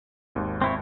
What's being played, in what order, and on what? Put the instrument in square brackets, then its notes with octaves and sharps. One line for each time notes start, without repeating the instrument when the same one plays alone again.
[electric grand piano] G#1 D#2
[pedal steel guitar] C4 E4 C#5